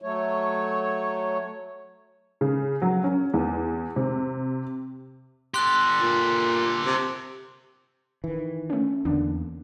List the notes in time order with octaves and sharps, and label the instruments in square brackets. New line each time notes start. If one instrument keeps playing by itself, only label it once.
[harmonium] F#3 A3 C#5
[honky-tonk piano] C#3
F#3
C#4
E2
C3
[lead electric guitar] G4 A4 [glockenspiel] C6 F#6
[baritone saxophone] A#2
C3
[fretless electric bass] D#3 E3
[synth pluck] A3 C#4
[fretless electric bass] E2 [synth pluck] D3 A#3 D4